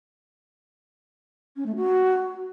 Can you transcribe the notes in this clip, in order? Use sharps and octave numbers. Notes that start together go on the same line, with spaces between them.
C#4
A3
F#4